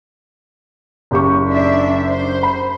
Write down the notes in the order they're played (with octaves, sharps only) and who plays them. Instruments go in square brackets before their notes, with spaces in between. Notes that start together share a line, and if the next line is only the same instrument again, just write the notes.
[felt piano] F#1 G4 C#6
[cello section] D4 E5
C5
[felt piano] B5